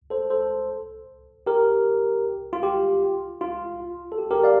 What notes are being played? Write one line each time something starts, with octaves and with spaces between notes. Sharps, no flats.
A4 C5
A4 C5
G4 A#4
F4
G4
F4
A4
G4
G4 A#4
D5 F5